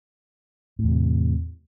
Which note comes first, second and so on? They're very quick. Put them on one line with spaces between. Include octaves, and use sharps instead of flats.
A2 E2 C3